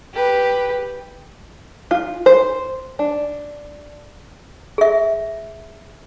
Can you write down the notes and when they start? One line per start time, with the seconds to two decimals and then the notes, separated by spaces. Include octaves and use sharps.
0.14 G4 B4
1.91 F4
2.26 C5
2.99 D4
4.78 G#4 E5